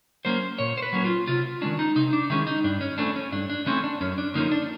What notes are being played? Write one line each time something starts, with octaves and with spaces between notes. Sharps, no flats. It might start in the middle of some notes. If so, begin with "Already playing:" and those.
F#3 A#3 C#4 C5
A#2 C#5
C5
B4
F#3 A#3 C#4
F4
C3 F4
D#3 G#3 C#4 D4
D#4
C3 D#4
D4
D#3 G#3 C#4 E4
D#4
G2 D4
C#4
E3 A3 C4 D4
C#4
G2 D4
D4
E3 A3 C4 C#4
D4
F#2 C#4
D4
D3 F3 A#3 C#4 D#4
D4